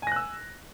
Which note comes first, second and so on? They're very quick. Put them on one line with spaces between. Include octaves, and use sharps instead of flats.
G#5 A#6 F#6 E6